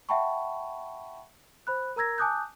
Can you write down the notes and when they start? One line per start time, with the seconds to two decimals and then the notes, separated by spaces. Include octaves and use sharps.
0.09 E5 F#5 G5 A5 B5 C#6
1.67 C5 B5 F#6
1.96 A#4 A#5 E6 G#6 A#6
2.18 G#5 A5 D6 D#6 F#6 G6